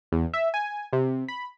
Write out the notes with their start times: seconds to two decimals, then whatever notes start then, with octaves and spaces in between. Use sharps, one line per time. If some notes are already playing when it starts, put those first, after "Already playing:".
0.12 E2
0.34 E5
0.54 G#5
0.93 C3
1.28 B5